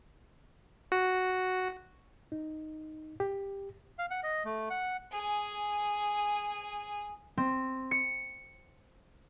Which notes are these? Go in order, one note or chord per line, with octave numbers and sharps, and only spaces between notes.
F#4
D#4
G4
F5
F#5
D#5
A3
F#5
G#4 G#5
C4
C#7